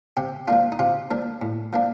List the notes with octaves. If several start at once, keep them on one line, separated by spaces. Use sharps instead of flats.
C3 G4
F3 A#3 D4 F4
D#4
C3 F4
F3 A#3 D4
A2
F3 A#3 D4